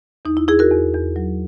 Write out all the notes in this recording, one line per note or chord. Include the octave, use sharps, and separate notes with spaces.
E2 D#4
E4
E2 E4 G#4
F#4 A#4
E2
E2
F#3